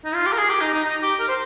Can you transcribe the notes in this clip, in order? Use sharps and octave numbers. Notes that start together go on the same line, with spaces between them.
D#4
F4
G4
A#4
G#4
G4
D#4
D#4
D#4
G4
A#4
C5